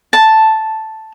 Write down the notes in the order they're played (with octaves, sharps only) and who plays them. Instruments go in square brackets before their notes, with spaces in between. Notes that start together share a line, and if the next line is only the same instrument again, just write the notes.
[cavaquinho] A5